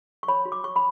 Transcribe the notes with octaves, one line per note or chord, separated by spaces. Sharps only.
C#6
C#5 B5
F#4
D6
C#5 C#6
B5